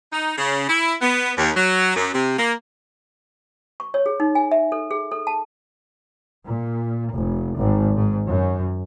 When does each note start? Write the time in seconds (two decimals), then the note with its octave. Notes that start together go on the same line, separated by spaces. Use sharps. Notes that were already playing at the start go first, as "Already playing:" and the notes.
0.13 D#4
0.38 C#3
0.69 E4
1.01 B3
1.38 D#2
1.57 F#3
1.96 F#2
2.14 C3
2.39 A#3
3.80 C#6
3.94 C#5
4.06 G#4
4.20 D#4
4.35 G#5
4.51 E5
4.72 A4
4.91 G#4
5.12 A4
5.27 A5
6.46 A#2
7.14 F1
7.57 G#1
7.95 G#2
8.26 F#2